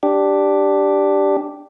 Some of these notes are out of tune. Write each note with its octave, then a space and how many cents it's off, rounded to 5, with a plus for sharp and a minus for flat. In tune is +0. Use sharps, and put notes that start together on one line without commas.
D4 +0 G4 +0